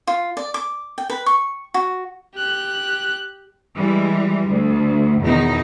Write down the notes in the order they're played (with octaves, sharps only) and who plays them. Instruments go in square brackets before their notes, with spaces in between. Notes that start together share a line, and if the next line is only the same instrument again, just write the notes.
[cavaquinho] F4
D5
D6
G5
B4
C#6
F#4
[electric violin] G4 F#6
[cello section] E3 G3 G#3
D2
E2 B2 D#3 D#4